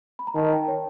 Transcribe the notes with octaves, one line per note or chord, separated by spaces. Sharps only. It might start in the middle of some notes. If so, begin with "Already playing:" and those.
B5
A#5
D#3 A5
G5
C#5